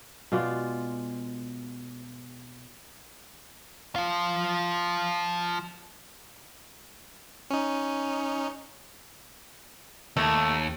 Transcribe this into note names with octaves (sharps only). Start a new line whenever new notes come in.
B2 G#3 F4 D5
F3 F4
C#4 D#4
D#2 A3